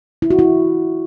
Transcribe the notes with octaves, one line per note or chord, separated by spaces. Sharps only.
E4
F#4
E4